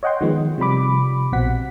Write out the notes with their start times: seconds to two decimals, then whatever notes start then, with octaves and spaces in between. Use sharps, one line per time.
0.03 C#5 D#5 F#5 G5 C6
0.21 D#3 F3 G#3 B3
0.58 C3 F3 G3 B5 D6
1.32 A#1 B2 C4 F#5 B6